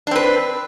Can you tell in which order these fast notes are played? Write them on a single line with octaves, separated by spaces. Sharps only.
D4 C4 B4